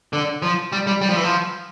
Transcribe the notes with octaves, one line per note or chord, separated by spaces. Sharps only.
D3
F3
G3
G3
G3
F3
E3
F3